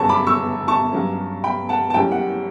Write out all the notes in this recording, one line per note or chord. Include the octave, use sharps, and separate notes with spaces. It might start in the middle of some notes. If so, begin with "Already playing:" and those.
Already playing: G1 F#2 C#3 F#3 A5 C#6
B5 D6
C#6 E6
A5 C#6
G2 F#3 C#4
G5 B5
F#5 A5
A5
F#1 F#2 E3 G3 C#4 G5
F#5